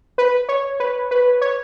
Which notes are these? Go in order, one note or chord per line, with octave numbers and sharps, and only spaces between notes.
B4
C#5
B4
B4
C#5